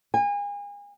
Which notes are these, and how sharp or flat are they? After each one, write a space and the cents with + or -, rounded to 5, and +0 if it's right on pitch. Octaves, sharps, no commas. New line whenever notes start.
G#5 -35